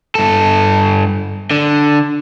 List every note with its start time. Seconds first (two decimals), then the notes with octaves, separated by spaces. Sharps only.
0.15 G2 A4
1.51 D3